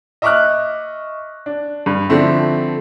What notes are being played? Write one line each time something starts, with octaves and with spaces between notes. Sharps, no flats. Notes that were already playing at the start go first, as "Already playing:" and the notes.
D#5 E5 C#6 D6 F6 F#6
D4
G2
D3 F3 A3 C4 E4